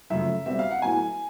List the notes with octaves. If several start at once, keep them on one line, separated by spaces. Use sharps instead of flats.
F#2 C#3 F3 A3 E5
B2 G3 C4 E5
F5
F#5
A2 F#3 B3 G#5